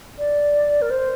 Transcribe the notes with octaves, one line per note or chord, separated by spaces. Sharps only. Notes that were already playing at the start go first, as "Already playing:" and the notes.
D5
A#4
C5